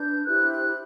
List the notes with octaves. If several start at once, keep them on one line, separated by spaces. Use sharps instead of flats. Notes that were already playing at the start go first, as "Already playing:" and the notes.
Already playing: D4 B4 G6
E4 G4 C5 F#6
F#6